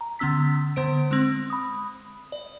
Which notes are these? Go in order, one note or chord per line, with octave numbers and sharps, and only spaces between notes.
A#5
D3 B3 C#4 E6 B6
D3 B3 C5 D7
G#3 C4
B5 D#6
D5